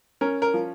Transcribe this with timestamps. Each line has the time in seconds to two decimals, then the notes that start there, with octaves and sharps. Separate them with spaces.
0.21 C#4 A#4
0.42 A#4
0.54 F3